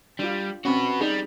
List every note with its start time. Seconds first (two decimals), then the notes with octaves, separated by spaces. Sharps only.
0.19 G3 D4 F4
0.65 C4 C#4 F#4 B4
1.01 G3 D#4 G#4